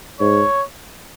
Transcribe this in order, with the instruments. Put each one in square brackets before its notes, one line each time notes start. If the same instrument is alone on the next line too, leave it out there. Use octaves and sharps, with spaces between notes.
[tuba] G#2 [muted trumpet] C#5